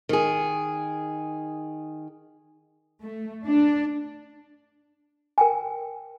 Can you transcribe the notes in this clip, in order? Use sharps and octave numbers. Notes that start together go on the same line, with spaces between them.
D#3 G#4
A3
D4
A#4 G5 G#5